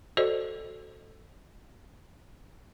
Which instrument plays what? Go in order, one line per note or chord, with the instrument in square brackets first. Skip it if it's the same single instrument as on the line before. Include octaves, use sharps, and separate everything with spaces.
[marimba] F#4 A4 C5 D5 D#5